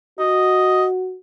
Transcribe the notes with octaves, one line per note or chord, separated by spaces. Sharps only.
F#4 D#5